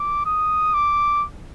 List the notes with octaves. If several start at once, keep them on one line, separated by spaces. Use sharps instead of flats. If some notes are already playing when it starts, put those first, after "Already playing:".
Already playing: D6
D#6
D6